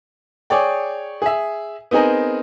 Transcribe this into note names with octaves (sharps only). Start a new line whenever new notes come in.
G#4 C#5 D5 G5
G#4 E5
B3 C4 D#4 G#4 A#4